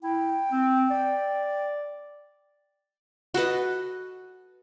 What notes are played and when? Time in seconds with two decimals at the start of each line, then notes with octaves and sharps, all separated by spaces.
0.03 E4 G5
0.52 C4
0.91 D5
3.34 F#4 A4 B4 D#5